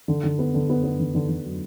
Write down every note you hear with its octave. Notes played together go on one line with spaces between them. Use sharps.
D3
D3
B3
D3
B3
B3
D3
D3
D3
F#3